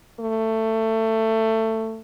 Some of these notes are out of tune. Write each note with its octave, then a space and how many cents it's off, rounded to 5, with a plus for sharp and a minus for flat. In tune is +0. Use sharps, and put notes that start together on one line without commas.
A3 +20